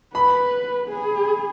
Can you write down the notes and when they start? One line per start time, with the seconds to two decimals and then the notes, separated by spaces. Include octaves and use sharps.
0.14 B4 B5
0.88 G#4